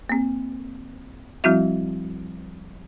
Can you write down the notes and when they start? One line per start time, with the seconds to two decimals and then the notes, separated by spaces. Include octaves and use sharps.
0.09 A#3 C4
1.44 F3 G3 C4 E4 F#4 E5